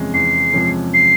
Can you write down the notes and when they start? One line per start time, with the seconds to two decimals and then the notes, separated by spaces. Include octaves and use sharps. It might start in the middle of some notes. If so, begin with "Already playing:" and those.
Already playing: E2 C3 F3 G#3 C#4
0.14 E2 C7
0.53 C3 F3 G#3 C#4
0.94 C7